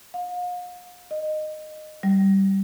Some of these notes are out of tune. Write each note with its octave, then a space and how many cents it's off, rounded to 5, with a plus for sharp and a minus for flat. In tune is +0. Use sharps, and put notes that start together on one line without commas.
F5 +45
D#5 -15
G3 -10